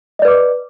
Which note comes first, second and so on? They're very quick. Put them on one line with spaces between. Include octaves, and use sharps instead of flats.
D#5 D5 B4 D6